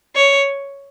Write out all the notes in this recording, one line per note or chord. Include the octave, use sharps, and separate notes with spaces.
C#5